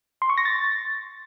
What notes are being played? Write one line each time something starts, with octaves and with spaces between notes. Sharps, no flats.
C6
C#6
A#6
A6